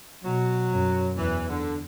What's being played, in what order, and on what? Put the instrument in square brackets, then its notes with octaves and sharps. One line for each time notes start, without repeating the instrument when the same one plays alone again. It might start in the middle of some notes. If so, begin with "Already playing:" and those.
[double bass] B2 [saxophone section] F#3
[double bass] F#2
[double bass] E2 [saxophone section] E3
[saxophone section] D3